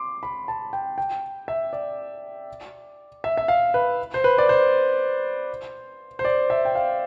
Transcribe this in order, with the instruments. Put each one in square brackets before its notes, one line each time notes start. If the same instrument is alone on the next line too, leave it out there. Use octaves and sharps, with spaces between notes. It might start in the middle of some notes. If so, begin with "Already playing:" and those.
Already playing: [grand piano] C6 D6
B5
A5
G5
G5
E5
D5
E5
E5
F5
B4
C5
B4
D5
C5
C5
D5
E5
G5
F5